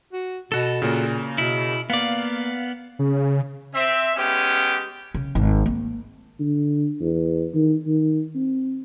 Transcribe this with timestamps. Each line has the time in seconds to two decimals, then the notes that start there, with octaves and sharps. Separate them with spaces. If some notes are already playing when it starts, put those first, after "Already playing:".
0.13 F#4
0.52 B2 F#4 A4
0.82 A#2 C#3 A#3
1.38 B2 E4
1.90 A#3 B3 D5 F5
2.99 C#3
3.74 C4 E5
4.16 G#3 B3 C#4 G4
5.15 C#3
5.35 G#1
5.66 A#3
6.39 D3
7.01 E2
7.54 D#3
7.87 D#3
8.35 C4